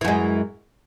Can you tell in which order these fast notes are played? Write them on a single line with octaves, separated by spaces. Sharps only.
E3 F#2 G#3